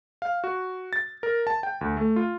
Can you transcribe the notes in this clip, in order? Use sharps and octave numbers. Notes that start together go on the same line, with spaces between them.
F5
F#4
A6
A#4
A5
G5
D2
A3
F4